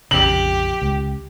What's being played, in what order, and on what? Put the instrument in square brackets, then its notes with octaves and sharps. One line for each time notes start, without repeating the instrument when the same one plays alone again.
[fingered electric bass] A#1 F2 C#3 [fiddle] G4 [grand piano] F#7
[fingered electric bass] C#2